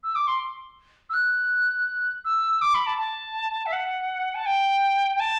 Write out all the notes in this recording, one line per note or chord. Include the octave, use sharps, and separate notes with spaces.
E6
D6
C6
E6
F#6
E6
D6
B5
A5
A5
E5
F#5
A5
G5
G5
A5